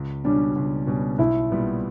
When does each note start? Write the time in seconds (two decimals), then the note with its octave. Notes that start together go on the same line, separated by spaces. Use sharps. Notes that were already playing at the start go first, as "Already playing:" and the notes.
Already playing: C#2
0.24 B2 G3 C#4 D4
0.56 C#2
0.87 B2 G3 C#4
1.18 B1 E4
1.51 A#2 G3 B3